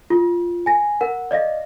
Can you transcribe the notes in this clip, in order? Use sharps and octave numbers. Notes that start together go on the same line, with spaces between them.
F4
G#5 A#6
A#4 F#5
D5 D#5 F5 A#6